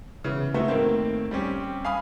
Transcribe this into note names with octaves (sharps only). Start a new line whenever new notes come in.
C#3 E3 B3
A3 B3 C4 D#4 F#4
A2 D#3 A#3 C4
G3 C4 C#4 G4
F5 G#5 B5 D#6